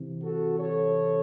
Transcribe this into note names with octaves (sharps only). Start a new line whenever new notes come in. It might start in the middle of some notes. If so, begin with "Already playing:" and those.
Already playing: C3 E3
F#4 A4
A4 C#5